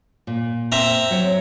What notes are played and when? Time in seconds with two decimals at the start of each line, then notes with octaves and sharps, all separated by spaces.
0.27 A#2
0.72 C4 E5 A#5
1.11 F#3 C#5